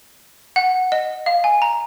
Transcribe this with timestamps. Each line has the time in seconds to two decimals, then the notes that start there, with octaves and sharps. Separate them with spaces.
0.56 F#5
0.92 D#5
1.26 F5
1.44 G#5
1.62 A#5